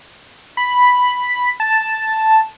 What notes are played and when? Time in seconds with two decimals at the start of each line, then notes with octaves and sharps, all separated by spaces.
0.57 B5
1.60 A5